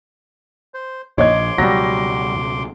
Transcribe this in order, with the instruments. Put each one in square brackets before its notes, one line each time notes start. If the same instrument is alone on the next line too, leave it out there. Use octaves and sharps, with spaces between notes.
[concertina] C5
[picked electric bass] A#1 [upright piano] C#5 D#5 G#6 [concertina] C6 D6
[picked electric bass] C#2 B2 [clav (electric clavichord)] F#3 G3 [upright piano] A#6